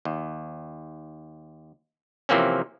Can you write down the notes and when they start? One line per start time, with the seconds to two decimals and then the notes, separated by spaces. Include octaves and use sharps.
0.05 D#2
2.29 C3 E3 F3 A#3 C4 C#4